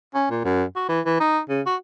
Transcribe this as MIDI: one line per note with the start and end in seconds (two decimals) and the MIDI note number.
0.14 0.30 61
0.30 0.40 46
0.45 0.64 42
0.76 0.84 66
0.89 1.01 52
1.06 1.18 52
1.20 1.39 63
1.49 1.61 49
1.66 1.76 66